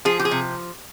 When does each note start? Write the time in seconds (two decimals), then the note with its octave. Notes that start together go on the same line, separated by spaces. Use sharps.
0.05 F3 G#4
0.19 G4
0.25 G#4
0.31 C3